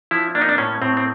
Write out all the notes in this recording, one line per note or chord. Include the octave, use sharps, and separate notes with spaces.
F3 E4
A#3 D4
D#4
D4
A2 C#4
A2 C4
C4